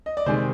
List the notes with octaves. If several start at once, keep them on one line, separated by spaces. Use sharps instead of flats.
D#5
D5
C3 D#3 G#3 C4 C5